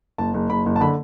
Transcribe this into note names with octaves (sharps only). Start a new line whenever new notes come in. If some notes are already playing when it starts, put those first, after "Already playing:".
F#1 A5
F#1
F#1 B5
F#1
A5
D3 B5